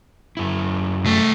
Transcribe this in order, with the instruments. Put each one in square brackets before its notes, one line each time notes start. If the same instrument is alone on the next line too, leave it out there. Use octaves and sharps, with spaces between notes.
[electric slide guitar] F#2 E4
[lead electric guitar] C2 A3